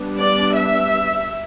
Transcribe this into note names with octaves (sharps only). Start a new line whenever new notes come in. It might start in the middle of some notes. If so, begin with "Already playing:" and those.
Already playing: G3 B3 D4
D5
E5